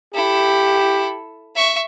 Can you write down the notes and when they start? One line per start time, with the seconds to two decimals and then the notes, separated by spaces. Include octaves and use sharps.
0.14 E4 G4 A4
1.56 E5 C#6